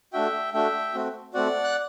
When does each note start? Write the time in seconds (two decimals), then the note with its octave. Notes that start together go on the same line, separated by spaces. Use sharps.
0.13 A3 D4 F#4 E5 G5
0.53 A3 D4 F#4 E5 G5
0.94 A3 C4 F#4
1.34 A3 C4 F#4 D5 F#5
1.64 F#6